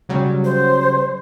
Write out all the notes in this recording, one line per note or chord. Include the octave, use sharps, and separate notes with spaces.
C#3 F#3 G3
C5